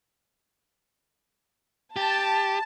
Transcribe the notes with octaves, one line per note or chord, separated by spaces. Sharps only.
G4 A5